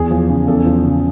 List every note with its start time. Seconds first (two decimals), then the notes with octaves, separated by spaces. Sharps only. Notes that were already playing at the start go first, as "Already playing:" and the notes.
Already playing: E2 G#4
0.11 F3
0.29 C#3
0.47 E2 A4
0.65 F3
0.84 C#3